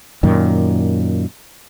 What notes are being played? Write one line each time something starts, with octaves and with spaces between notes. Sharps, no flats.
F#2 A#2 D#3